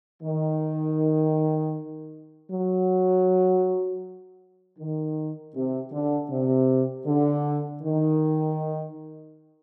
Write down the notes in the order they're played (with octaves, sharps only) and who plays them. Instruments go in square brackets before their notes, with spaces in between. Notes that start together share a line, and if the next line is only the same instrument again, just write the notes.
[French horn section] D#3
F#3
D#3
C3
D3
C3
D3
D#3